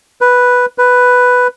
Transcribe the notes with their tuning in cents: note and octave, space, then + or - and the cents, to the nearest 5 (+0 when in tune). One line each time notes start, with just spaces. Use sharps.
B4 +0
B4 +5